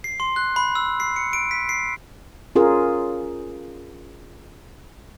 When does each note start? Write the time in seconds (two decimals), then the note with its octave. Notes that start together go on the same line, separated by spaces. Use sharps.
0.04 C7
0.20 C6
0.36 F#6
0.56 B5
0.75 E6
1.00 C7
1.16 C#7
1.33 D7
1.51 B6
1.69 C7
2.56 C#4 F4 G#4 A#4